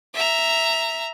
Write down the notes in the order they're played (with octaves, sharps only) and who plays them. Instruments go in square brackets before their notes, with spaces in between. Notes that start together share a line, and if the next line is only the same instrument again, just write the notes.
[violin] E5 A#5